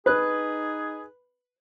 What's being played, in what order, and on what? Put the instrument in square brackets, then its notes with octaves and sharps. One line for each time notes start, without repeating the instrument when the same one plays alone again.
[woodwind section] D#4 G#4 [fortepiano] B4 F#6